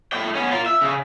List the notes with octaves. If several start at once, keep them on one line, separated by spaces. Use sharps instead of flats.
A3 G5
B3 C#4
F4 A#4
E5
C#3